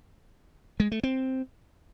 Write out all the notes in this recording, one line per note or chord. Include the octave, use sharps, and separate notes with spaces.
G#3
A3
C4